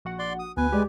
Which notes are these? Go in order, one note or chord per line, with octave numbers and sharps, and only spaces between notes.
A#1 F#4 F#5
D5 C6
D#6
D2 B3 B4 G#5
G#3 G4 D5